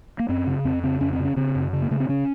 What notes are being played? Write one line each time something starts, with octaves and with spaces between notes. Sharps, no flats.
A#3
F#2 C4
C#3
F2 C4
C#3 C4
F2 C#4
C4
C#3
C#4
C#3 C4
F#2
C#3
A#3
C#3 A3
C4
C#3 C#4